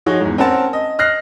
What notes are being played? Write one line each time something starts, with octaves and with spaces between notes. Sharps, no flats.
F3 D#4 F#4 G#4 C#5 D#5
E2 G#2
C4 C#4 A#4 C5 F#5 A5
D#5
D#5 F6 F#6 A#6 C7